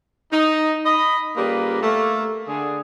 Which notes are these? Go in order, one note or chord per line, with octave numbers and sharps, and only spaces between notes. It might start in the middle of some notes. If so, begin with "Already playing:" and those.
D#4
D#5 B5
C#3 G3 A#3 F4 G4 B4
A3 A#3
D3 G#4